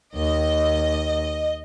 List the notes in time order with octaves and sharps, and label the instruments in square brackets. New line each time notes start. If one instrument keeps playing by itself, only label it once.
[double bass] D#2 [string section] D#5